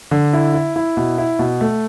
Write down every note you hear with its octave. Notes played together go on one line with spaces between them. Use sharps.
D3
E4
E4
E4
B2
E4
B2
A3